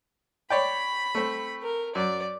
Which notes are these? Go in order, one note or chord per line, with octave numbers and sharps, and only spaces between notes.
C#5 D5 G5 B5
A3 C4
A#4
F#2 D5